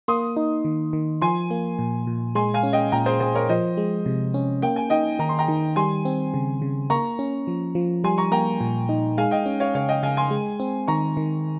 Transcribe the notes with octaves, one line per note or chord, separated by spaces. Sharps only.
A#3 C6 D#6
D#4
D#3
D#3
F3 G#5 C6
A#3
A#2
A#2
G#3 G#5 C6
F5 G#5
C#4
D#5 G5
A#2 G5 A#5
G#4 C5
A#2 G#4 C5
A#4 C#5
F3 C5 D#5
G#3
C3
C#4
A#3 G5
G#5
D#4 D#5 G5
D#3 A#5
C6
G5 A#5
D#3
G3 G#5 C6
C4
C#3
C#3
A#3 A#5 C#6
C#4
F3
F3
G3 G#5 C6
A#5 C#6
A#3 G5 A#5
A#2
D#4
G#3 F5 G#5
D#5 G5
C#4
C#5 F5
C#3 C#5 F5
D#5 G5
C#3 F5 G#5
G#5 C6
G#3
C4
D#3 A#5 C#6
D#3